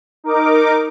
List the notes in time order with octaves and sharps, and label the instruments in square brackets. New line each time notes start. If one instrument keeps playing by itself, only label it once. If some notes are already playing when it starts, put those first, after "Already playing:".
[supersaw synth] D#4 A#4 D6